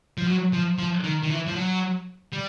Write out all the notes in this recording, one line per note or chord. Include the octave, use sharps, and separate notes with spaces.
F3
F#3
F3
F3
D#3
D#3
E3
F3
F#3
G3